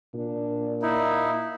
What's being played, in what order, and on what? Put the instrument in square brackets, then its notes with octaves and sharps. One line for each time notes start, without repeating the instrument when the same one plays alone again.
[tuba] A#2 [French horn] D4
[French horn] A#3 [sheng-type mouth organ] D#4 E4